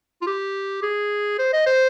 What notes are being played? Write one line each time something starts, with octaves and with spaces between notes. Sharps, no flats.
F4
G4
G#4
C5
D#5
C5